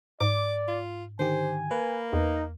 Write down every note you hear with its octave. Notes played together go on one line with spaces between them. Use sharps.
G#2 D5 D6
F4
D3 D#3 G4 C5 G#5
A#3 B4
E2 D#4